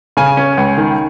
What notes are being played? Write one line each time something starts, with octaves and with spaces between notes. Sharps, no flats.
C#3 G#5
C#4
C#2
D#3